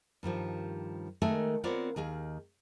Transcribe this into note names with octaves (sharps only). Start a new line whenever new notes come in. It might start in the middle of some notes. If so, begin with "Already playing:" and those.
G2 D#3 F3 G3
D#3 G#3 A3 A#4 E5 G#5
B3 C4 F4 A#4 C#5 D5
D#2 D#3 G#4 F5